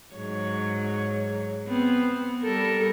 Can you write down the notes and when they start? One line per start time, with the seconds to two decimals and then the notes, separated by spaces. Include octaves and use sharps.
0.15 G#2 F#3 C#5
1.67 B3 C4
2.43 G3 A4 A#4